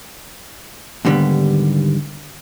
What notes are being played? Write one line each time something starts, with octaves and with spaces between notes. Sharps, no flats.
D#2 G#2 D3 G3 B3